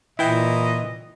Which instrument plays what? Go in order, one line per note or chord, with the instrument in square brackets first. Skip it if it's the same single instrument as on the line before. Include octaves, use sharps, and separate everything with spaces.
[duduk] A#2 [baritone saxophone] E3 [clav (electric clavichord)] E4 G5 [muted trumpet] D#5